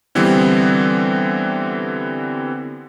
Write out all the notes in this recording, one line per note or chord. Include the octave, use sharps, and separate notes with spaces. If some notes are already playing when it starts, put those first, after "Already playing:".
D3 E3 G3 B3 C4